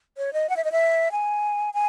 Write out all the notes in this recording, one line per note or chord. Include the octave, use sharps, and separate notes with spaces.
C#5
D#5
F#5
E5
D#5
E5
G#5
G#5